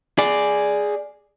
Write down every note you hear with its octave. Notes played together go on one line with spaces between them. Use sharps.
G#4 D5